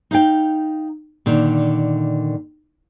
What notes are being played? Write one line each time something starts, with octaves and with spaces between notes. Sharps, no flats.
D#4 F5 G5
A#2 D3 D#3